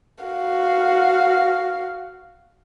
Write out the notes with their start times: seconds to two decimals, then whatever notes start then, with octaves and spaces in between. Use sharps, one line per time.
0.24 F#4 F5